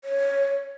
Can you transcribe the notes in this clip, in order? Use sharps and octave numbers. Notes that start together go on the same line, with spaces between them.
C#5